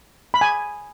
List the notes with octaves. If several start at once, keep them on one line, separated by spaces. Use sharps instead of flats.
B5
G#5